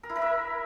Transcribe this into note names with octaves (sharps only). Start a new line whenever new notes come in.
A#4
E4
A#4
E5